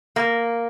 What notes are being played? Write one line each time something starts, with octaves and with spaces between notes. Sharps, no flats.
A#3